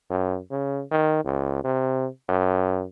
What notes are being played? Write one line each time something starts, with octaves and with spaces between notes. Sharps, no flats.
F#2
C#3
D#3
C#2
C3
F#2